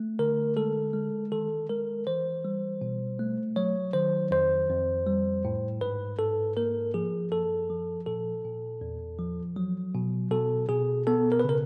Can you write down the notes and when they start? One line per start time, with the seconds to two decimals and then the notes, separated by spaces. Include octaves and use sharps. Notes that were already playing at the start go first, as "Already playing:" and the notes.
Already playing: A3
0.19 D3 A#4
0.56 G#3 A4
0.93 G#3
1.32 D#3 A4
1.69 G#3 A#4
2.07 E3 C5
2.45 G3
2.81 B2
3.19 A3
3.56 F#3 C#5
3.93 D#3 C5
4.31 F2 C5
4.70 F2
5.07 G3
5.45 A2
5.81 G#2 B4
6.19 G#2 A4
6.57 A#3 A#4
6.94 F3 G#4
7.31 F#2 A4
7.70 F3
8.06 A#2 A4
8.45 A#2
8.81 E2
9.19 F3
9.56 F#3
9.95 B2
10.31 B2 A4
10.69 B2 G#4
11.07 B3 A4
11.32 A#4
11.40 B4
11.45 C#3 A#4